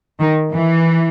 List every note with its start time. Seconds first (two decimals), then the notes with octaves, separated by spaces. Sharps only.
0.20 D#3
0.53 E3